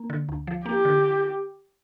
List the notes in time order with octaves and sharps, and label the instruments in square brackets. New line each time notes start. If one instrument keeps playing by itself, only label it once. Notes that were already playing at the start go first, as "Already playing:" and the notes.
Already playing: [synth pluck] A#3
D3
D2
F3
[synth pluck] A#3 [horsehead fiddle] G4
[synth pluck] D3